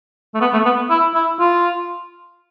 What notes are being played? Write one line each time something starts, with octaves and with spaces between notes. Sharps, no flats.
A3
B3
A3
B3
E4
E4
F4